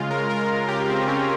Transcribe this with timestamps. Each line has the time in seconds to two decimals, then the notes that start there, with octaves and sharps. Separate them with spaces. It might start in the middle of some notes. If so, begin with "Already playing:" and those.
Already playing: C#3 G#3 F4
0.11 A#4
0.30 A#4
0.69 C#3 G#3 G4
0.89 C4
1.08 C#4